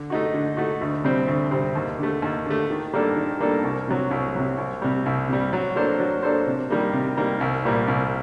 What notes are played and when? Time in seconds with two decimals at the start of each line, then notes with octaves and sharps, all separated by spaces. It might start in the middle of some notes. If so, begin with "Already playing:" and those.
Already playing: D3
0.10 A3 D#4 F#4
0.34 D3
0.57 A3 D#4 F#4
0.81 D2
1.04 C3 G3 C4
1.28 D2
1.51 C3 G3 C4
1.75 D#2
1.98 D3 A3
2.22 D#2
2.46 D3 A3
2.70 D#3
2.93 G3 A#3 D4 A4
3.16 D#3
3.40 G3 A#3 D4 A4
3.64 C2
3.88 C3 F#3
4.11 C2
4.35 C3 F#3
4.58 C2
4.82 C3 G3
5.06 C2
5.28 C3 G3
5.53 F#3
5.76 A#3 D4 A4 C5
6.00 F#3
6.23 A#3 D4 A4 C5
6.47 C3
6.70 D#3 G3 A#3
6.93 C3
7.17 D#3 G3 A#3
7.40 C2
7.65 A#2 G3 A#3
7.88 C2